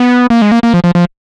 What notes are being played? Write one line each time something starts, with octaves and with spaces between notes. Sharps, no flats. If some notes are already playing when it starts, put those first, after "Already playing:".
Already playing: B3
A#3
G#3
A#3
A#3
F3
F3
F3